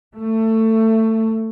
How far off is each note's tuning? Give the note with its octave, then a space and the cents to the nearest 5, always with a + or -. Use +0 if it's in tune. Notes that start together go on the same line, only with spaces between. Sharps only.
A3 +20